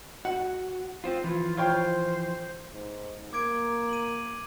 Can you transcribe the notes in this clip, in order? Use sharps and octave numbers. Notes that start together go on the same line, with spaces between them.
F#4 F#5
C4 F4 C5
E3 F3 F4
F4 C5 C#5 G5
G#2
A#3 D6 G#6 D7
D#7 F#7